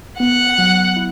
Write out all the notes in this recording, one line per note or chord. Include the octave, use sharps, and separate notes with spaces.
B3 F#5
F#3
E4